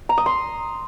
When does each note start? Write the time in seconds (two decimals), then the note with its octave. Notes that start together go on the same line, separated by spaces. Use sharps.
0.09 A#5
0.18 D#6
0.26 C6